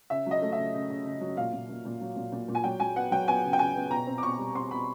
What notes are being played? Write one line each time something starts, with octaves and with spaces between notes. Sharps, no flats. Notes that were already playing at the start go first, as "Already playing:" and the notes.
C#3 E5
F#3 D#5
A3
E5
C#3
C#3
C#3
C#3
F#3
A#2 F5
A#2
A#2
A#2
F#3
A#2
A#2
A#2
G#5
F#3 G5
F#3 G#5
B3 F#5
F#3 G5
B3 G#5
C#3
G5
C#3 G#5
B3
B2 A#5
C4
D6
B2 C#6
G3
C4 C6
B2 B5